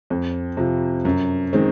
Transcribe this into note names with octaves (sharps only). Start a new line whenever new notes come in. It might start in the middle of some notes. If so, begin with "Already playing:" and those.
F2
C3 F3
F#2
D#3 G#3 C4